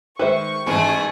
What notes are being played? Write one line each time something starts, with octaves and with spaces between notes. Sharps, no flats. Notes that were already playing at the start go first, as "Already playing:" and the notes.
D#3 G#3 B4 C5 E5 C#6
A1 G#2 E3 A3 G#4